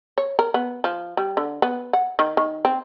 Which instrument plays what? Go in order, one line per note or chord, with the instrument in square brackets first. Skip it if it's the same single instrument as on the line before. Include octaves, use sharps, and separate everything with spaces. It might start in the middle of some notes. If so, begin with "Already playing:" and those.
[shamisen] C#5
A#4
B3
F3
G3
D3
B3
F#5
D#3
D#3
C4